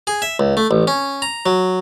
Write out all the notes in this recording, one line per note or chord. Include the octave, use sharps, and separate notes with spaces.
G#4
E5
C#2
A3
A1
C#4
A#5
F#3